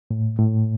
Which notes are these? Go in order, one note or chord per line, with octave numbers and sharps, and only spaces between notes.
A2
A2